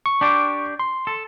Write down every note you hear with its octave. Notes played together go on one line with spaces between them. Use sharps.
C#6
D4 G4 D5
C6
A4